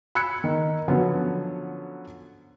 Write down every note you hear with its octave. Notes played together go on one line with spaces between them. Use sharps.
B5 E6 F#6 G#6 C#7
D#3
D3 F3 F#3 B3 C#4